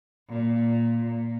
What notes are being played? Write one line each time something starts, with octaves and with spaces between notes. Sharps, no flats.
A#2
A#2